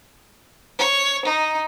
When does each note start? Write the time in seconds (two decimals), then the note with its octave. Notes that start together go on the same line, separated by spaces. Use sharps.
0.79 C#5
1.25 D#4